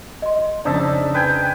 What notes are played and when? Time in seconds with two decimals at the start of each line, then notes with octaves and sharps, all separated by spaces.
0.22 D#5 C6
0.65 F2 C#3 D4 D#4 C5 D5 E5 A5
1.14 B4 G5 G#5